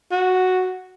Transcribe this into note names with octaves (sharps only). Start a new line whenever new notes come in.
F#4